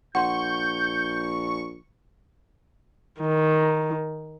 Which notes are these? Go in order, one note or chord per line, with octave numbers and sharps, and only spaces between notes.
A#1 F#5 C6 C#6 G6
D#3